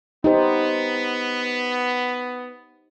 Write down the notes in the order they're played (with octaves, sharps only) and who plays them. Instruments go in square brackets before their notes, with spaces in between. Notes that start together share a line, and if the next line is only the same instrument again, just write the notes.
[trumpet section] B3 [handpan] D#4 G4 C5